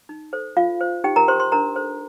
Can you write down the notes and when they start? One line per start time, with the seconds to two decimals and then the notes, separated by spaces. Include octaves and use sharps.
0.09 D#4
0.33 A4 C5
0.57 F4 F5
0.81 C5
1.04 D#4 G4 G5
1.16 A#4 A#5
1.28 G4 A#4 C5 C6
1.40 C5 C6
1.52 D4 A#4 A#5
1.76 A4 C5